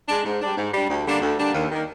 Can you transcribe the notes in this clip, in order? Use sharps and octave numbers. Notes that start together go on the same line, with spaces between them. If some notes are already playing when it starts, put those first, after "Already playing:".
G#3 D4
G#2
G3 D4
G#2
G3 D4
D2
D3 G3 A#3 D4
D2
D3 G3 A#3 D4
D#2
D#3 A#3